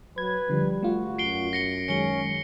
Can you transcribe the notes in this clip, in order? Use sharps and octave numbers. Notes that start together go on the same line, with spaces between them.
F#3 B4 G#6
D3 F3 G3
A3 F4 F#4
F#2 C7 D7 G7
A#6 C#7 G7
D#3 F#3 G#3 C#4 C#7 G7